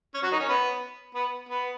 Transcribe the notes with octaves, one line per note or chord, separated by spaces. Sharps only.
C#4 C#5
F#3 F#4
D#3 D#4
C#4
B3
B3
B3